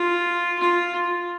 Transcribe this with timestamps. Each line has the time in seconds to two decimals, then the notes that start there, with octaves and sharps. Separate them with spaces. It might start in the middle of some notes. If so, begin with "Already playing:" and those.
Already playing: F4
0.59 F4